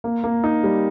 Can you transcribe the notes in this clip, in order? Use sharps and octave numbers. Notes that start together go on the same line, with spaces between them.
A#3
A#3
D#4
G3